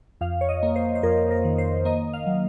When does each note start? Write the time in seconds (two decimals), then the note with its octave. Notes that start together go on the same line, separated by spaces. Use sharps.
0.21 F2 F5
0.41 C#5
0.49 D#5
0.63 A#3
0.76 C5
0.95 C5
1.03 F2 A#4
1.31 A#4
1.44 D#3
1.58 C5
1.85 A#3 D#5
2.13 F5
2.26 F#3